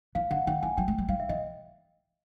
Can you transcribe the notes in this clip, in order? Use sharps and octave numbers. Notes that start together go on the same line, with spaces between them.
E3 F5
D3 F#5
D#3 G5
E3 G#5
F#3 G5
G#3
G3
G3 F5
E5
E3 D#5